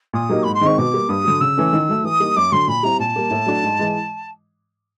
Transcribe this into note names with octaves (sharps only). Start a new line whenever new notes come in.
A#2 D#6
F#3 A#3 D#4 G4
G#2 B5
C6
D#3 G#3 C4 D#4 C#6
B2 D6
G3 A#3
G2 D#6
D3 F#3
C#3 E6
E3 A3 C#4
D#3
F#3 A3
E3 D#6
G3 A#3 D#4
F#2 D6
D3 F#3 C6
A#2 B5
G3 C4 E4 A#5
A#2 A5
G3 A#3
A2
F#3 A3 D4 F#4
G#2
E3 G#3